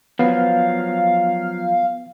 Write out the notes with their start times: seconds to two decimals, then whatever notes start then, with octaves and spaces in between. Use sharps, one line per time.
0.19 F3 F#3 B3 F5